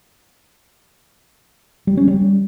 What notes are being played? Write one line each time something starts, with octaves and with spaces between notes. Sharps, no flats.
G3
C#4
G3